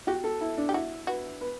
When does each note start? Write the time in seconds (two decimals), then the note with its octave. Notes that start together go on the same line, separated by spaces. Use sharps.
0.07 F#4 G4
0.24 A4
0.41 E4
0.58 D4
0.69 G4
0.74 E4 F#4
1.07 F#4 B4
1.41 B4